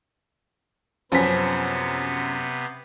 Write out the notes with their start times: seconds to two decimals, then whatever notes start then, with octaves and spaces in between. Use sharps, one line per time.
1.12 F#2 C3 F3 B3 C#4 G#5 B6